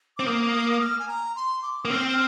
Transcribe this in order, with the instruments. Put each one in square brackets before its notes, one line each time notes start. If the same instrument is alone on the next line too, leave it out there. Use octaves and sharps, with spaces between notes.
[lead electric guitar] C4 [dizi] D6
[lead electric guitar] A#3 [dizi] D#6
[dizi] D#6
D#6
F6
G#5
A#5
C6
D6
[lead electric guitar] A#3 [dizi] D#6
[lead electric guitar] C4 [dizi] F6